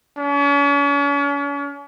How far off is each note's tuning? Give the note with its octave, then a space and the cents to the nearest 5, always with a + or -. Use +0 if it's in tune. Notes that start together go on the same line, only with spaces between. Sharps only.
C#4 +40